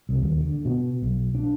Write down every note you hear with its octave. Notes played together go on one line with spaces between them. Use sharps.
C2
D#2
D3
B2
B1
D4